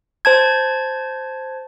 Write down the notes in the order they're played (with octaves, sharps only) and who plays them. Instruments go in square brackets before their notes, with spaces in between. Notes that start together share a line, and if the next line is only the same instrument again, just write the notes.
[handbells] C5 A5 G#6